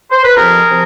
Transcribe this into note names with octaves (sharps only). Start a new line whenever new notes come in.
C5
B4
F2 C3 F3 G#4 A#4
C3 F3